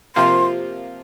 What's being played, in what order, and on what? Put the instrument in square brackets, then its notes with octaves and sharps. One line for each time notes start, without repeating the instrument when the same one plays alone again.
[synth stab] C3 F3 A#3 F4 [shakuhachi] C6